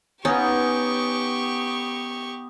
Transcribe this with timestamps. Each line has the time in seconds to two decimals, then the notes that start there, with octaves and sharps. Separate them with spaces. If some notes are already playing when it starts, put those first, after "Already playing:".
0.25 B3 C#4 D#4 G4 C#6